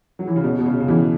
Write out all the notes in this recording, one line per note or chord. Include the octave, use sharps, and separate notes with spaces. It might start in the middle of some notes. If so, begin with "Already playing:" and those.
F#3
E3
C#3
B2
B2
C#3
C#3
B2 E3